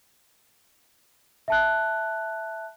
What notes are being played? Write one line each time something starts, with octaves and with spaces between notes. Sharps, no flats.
E5 A5 F#6